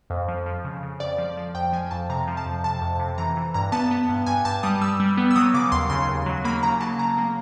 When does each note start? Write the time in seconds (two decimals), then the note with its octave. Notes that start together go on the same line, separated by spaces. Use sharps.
0.10 F2
0.28 F3
0.46 F3
0.65 C#3
0.83 C#3
1.00 F2 D5
1.18 F3
1.37 F3
1.54 F2 G5
1.73 F3 G#5
1.91 F2 A5
2.09 C3 A#5
2.27 F3
2.37 A5
2.46 F2
2.64 C3 A5
2.82 F2
3.00 C3
3.18 E3 A#5
3.37 E3
3.54 G2 A#5
3.72 B3 A5
3.91 B3
4.09 G2
4.26 G2 G#5
4.45 G2 A5
4.63 G3 D#6
4.81 G3 E6
5.00 G3
5.17 B3
5.31 E6
5.36 F#3 D#6
5.54 C#3 D6
5.72 D#2 C6
5.90 C#3 C6
6.09 D#2
6.26 F#3
6.45 A#3 B5
6.63 C#3 A#5
6.81 F#3 A5
6.98 C#3 A#5
7.18 A#3